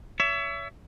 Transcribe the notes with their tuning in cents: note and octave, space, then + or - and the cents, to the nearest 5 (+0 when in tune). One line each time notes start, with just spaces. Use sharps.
C#5 +35 E5 +20